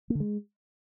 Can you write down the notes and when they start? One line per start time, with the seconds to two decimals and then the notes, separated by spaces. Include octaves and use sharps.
0.10 A#3
0.15 D3
0.20 G#3